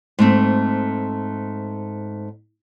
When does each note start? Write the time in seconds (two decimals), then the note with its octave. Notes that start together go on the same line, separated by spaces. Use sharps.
0.19 G#2 A3 C4